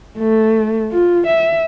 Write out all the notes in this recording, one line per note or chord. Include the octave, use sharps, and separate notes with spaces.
A3
F4
E5